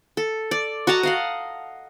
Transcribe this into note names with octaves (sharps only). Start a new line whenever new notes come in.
A4
D5
F#4 D#5 A5 A#5
D#5 F5 F#5